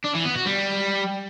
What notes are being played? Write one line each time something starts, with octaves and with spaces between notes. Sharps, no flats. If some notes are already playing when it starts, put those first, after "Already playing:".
D4
E3
B3
F#4
G3